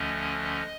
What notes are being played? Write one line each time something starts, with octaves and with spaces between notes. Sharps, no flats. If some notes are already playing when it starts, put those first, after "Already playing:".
Already playing: D2 D3 F3 A3 C#4 D#5